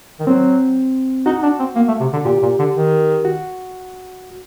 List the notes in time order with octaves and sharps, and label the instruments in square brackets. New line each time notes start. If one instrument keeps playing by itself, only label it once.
[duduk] D#3
[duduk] F#3 [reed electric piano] C4
[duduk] D#4 [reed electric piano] F#4
[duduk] D4
C4
A#3
A3
C3
D3
[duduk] A#2 [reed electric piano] G4
[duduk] A#2
D3
D#3
[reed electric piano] F#4